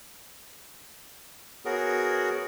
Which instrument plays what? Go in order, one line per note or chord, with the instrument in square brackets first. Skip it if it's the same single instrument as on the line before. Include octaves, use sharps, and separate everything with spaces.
[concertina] B3 F#4 G#4 A#4 C#5